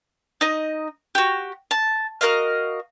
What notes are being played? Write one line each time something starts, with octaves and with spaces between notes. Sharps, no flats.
D#4 D#5
F#4 G4
A5
F#4 A#4 D#5 F5